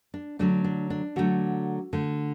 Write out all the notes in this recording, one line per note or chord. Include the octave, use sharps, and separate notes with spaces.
D4
D3 F#3 A3 D4
D4
D4
D3 F#3 A3 F#4
D3 A3